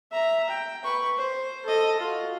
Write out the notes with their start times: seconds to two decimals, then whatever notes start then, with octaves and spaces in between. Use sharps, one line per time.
0.12 E5 A#5
0.50 G5
0.84 B4 C#6
1.17 C5
1.66 A4 D#5
2.00 F4 F#4